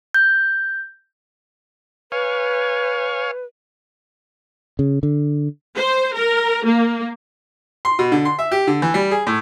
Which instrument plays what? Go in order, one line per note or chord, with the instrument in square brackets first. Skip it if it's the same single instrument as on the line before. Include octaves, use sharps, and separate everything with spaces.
[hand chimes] G6
[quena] B4 [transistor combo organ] C#5 F5 G#5
[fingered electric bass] C#3
D3
[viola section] C5
A#4
A#3
[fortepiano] C6
B2
D3
C6
E5
G4
D3
E3
G3
G#4
A2